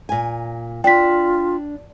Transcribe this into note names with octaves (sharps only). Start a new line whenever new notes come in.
A#2 G#5
D4 F4 G5 B6